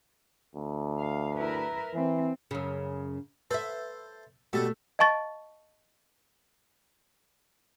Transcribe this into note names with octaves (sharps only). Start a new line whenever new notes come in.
D2
F5
E4 A#4 B4
E3 C4
F#2 C#3
A4 B4 C5 E5
B2 G3 A3 A4
D#5 F5 A5 C#6 A6